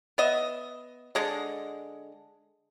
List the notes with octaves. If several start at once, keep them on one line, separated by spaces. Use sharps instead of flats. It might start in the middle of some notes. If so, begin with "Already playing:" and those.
B3 D#5 E5
D3 G#3 D#5